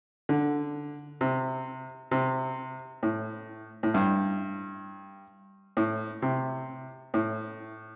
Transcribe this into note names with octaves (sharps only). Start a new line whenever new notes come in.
D3
C3
C3
A2
A2
G2
A2
C3
A2